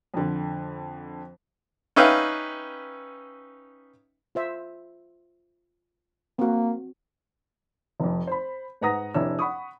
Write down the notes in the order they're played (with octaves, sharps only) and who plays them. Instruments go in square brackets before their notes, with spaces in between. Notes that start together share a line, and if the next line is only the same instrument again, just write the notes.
[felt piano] F2 D3
[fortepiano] C#4 D#4 B4 E5 F5 G5
[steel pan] F4 C5 E5
[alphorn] A#3 [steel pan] C4 F#4
[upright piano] F1 F2
C5 B5
G#2 B4 F#5 A#5 D#6 A#6
F1 D4 E4 C#5 E6
F#5 B5 C#6 D#6